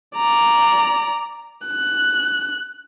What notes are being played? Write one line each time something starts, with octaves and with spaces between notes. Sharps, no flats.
D5 A#5
F#6